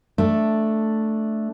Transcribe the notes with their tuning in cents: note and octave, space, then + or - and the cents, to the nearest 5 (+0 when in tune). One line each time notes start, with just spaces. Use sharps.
A3 +0 D4 +0